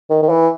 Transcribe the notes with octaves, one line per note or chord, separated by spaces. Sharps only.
D#3
D#3
E3